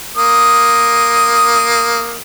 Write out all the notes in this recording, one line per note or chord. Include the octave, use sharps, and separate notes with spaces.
A#3 D#6